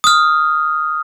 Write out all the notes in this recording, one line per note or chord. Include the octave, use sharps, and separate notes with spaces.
D#6 F6